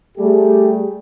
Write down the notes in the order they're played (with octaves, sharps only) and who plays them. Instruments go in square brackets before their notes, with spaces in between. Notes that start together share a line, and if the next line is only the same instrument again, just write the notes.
[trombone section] G3 A3 G4 G#4